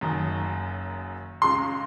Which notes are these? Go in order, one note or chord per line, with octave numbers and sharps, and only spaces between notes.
F#1 F#2 D#3
C#2 C#3 G#3 C6